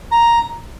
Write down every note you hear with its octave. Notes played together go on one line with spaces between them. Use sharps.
A#5